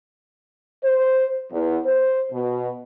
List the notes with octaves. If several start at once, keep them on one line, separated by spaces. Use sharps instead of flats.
C5
E2
C5
B2